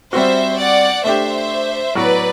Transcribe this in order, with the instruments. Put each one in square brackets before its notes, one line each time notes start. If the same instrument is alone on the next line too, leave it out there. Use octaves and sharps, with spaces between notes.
[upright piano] G3 C4 F#4 [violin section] C5 E5
[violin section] D5 F#5
[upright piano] A3 D4 G4 [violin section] C5 E5
[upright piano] A2 F#3 B3 F#4 [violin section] B4 D5